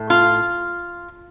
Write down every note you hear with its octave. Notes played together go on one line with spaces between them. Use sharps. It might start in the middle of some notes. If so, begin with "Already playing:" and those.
Already playing: A2 A3
F4